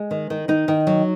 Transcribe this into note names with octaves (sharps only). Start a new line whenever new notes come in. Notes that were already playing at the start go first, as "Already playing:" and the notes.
Already playing: G#3
D#3
D#3
D#3 D#4
D#3
F#3